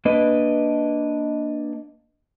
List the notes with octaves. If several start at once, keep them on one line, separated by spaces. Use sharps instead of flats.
A#3 D4 B4 D#5